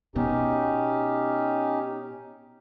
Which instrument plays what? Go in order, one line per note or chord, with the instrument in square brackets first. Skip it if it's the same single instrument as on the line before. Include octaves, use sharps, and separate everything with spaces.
[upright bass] B2 [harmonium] C#4 D#4 G4